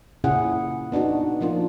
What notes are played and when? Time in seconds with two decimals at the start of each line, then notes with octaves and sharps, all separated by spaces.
0.24 A#2 C#3 C#4 E4 G#4 F#5
0.92 B3 D4 D#4 F#4
1.41 F3 A#3 D4 F4